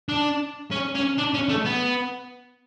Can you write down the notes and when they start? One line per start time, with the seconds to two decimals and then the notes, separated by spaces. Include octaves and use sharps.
0.09 D4
0.71 C#4
0.95 C#4
1.18 D4
1.34 C#4
1.50 A3
1.65 B3